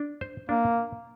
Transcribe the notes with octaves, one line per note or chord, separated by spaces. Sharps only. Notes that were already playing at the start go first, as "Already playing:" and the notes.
Already playing: D4
C5
A#3 D4